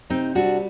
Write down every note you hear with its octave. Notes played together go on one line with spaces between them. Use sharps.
C3 C4 D#4
G3 D4 F#4